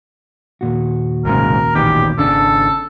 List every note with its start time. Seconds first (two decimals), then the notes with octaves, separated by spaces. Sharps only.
0.61 D#2 A#2 F#4
1.25 C2 G#2 C#3 A#4
1.75 A1 B2 D#3 G4
2.18 G#1 C#3 D4 A4